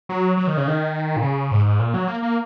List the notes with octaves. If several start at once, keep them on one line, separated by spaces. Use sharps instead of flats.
F#3
F#3
D#3
C#3
D#3
A#2
C#3
G#2
G#2
A#2
F#3
A#3
A#3